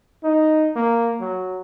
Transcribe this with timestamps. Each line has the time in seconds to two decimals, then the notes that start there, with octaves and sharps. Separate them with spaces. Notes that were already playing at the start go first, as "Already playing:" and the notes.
0.24 D#4
0.75 A#3
1.20 F#3